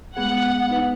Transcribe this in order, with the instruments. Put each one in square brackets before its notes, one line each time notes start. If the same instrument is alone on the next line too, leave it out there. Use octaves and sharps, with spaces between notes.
[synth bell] G#3 B3 G#4 [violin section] F#5
[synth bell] B3 D#4 B4